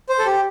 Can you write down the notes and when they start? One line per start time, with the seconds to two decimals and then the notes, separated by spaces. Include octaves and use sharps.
0.09 C5
0.19 A4
0.26 G4